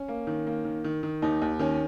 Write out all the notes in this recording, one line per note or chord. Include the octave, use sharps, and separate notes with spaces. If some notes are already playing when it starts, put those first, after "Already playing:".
Already playing: C#4
A#3
D#3
A#3
D#3
D#3
D#3
D#2 D#4
D#2
D#3 C#4